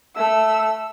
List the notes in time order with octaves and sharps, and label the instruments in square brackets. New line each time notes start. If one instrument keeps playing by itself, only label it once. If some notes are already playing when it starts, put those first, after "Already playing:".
[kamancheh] A3 E6